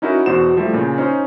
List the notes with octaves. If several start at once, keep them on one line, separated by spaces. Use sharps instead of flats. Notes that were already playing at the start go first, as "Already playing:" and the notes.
C#4 D#4 E4 F#4 A#4
E2 B2 F#4 C5 E7
F3 G3 A3 E4
A#2 C#3
C#4 D#4 C5